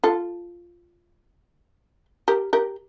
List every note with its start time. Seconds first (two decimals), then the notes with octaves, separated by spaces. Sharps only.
0.04 F4 A4
2.28 G4 A#4
2.53 G4 A#4